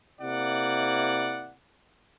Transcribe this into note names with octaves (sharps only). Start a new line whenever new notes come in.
C3 A#3 E4 D5 F#5